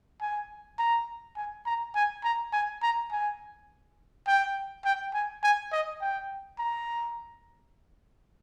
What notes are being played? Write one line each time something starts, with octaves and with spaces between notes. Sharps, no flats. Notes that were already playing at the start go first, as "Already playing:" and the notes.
G#5
A#5
G#5
A#5
G#5
A#5
G#5
A#5
G#5
G5
G5
G#5
G#5
D#5
G5
A#5